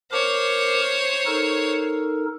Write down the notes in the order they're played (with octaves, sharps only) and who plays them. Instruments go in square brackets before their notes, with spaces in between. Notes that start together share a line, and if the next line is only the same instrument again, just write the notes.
[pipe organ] A#4 D6 [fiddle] C5 C#5
[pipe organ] D#4 A4 A#4